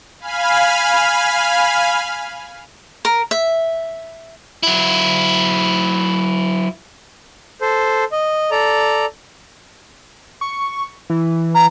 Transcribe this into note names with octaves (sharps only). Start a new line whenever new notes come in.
F5 G#5 B5 F6
A#4
E5
F#3 E4
A4 C5
D#5
A4 D5 A#5
C#6
E3
A#5